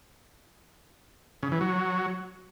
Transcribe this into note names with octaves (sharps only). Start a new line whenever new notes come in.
C#3
E3
F#3